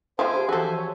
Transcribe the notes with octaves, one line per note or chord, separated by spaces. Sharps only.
F3 C5 E5 G5 G#5 B5
G4 G#4
E3 F3 F#4 A4 C5 E5 G#5
C#5